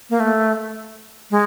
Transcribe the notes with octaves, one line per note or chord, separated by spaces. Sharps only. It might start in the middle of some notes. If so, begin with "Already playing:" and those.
A#3
A3
G#3